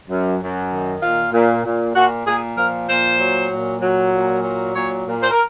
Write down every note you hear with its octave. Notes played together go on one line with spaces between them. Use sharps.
F#2
F#2
D#3
A#2 F4
A#2
A#2
A#2 F#4
A#2 G#4
F3 A#4
A#2 C5
F#3
A#2
F#3
A#2
F#3
A#2 C#5
A#2
C5
A#4